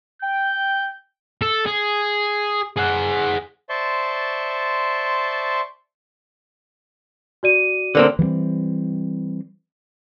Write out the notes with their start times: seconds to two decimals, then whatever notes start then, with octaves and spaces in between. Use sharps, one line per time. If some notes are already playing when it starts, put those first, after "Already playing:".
0.22 G5 G6
1.42 A4
1.66 G#4
2.77 G#4 F#5
3.69 C5 D5 E5 A5 C6 C#6
7.43 F#4 D5 D#7
7.95 D3 A#3 C4
8.19 E3 G3 G#3 C4